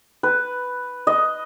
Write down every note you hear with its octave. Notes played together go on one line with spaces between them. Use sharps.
B4
D#5